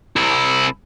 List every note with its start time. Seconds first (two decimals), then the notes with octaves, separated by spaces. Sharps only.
0.16 C2 E4